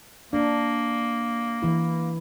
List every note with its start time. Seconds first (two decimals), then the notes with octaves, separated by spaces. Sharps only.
0.33 A#3 D4
1.62 E3 E4